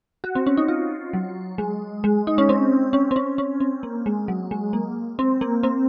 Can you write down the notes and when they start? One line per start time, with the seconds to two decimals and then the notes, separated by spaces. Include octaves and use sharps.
0.24 F#4
0.35 C4
0.46 C#4
0.57 D#4
0.68 F4
1.13 F#3
1.58 G#3
2.04 G#3
2.27 D#4
2.38 C#4
2.49 C4
2.93 C#4
3.11 C4
3.16 C#4
3.38 C#4
3.60 C4
3.83 A#3
4.06 G#3
4.28 F#3
4.51 G#3
4.73 A#3
5.19 C4
5.41 A#3
5.63 C4